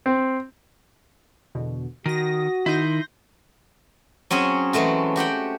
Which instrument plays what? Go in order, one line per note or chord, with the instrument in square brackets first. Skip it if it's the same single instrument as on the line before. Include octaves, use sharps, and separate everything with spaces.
[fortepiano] C4
[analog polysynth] E2 B2 D3
[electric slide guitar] D#3 [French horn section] F#4 [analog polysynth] D#6 A#6
[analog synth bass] D#3 [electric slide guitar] D#4 E4 [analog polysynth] C6 G6 A#6
[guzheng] F#3 C4 C#4 G#4
E3 F#3 G#3 A3 F#4
F#4 G4 F#5 G5